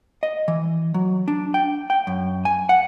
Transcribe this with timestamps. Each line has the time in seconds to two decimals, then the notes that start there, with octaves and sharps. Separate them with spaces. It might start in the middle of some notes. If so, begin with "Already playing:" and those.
0.23 D#5
0.48 E3
0.94 F#3
1.28 D4
1.54 G5
1.90 G5
2.07 F#2
2.45 G#5
2.69 F#5